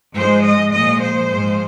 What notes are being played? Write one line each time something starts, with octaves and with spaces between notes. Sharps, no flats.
G#2 F3 G#3 C5
D#5
A#2 F3 G#3 D#5
C5
G#2 F3 G#3